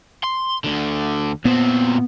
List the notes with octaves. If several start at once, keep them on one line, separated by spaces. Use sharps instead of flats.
C6
D2 D3
A#2 B3 C4